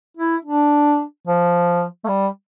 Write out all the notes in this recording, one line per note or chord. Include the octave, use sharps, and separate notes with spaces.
E4
D4
F3
A3
G3